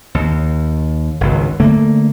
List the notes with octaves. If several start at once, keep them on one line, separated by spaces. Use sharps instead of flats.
D#2
G#1 C#2
D3 A3 A#3